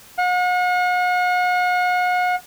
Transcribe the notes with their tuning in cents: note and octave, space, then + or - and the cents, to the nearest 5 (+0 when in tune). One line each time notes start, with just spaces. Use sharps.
F#5 -40